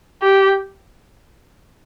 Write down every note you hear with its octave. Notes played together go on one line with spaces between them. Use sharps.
G4